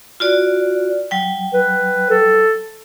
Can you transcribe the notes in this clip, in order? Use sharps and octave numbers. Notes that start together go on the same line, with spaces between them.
F4 F#4 D5
F#3 G5
B4
A4